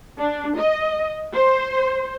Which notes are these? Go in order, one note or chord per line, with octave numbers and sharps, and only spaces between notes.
D4
D#5
C5